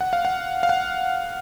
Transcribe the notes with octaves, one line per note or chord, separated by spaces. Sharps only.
F#5
F5
F#5
F5
F#5